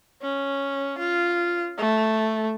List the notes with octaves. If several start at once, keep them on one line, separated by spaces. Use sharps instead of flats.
C#4
F4
A3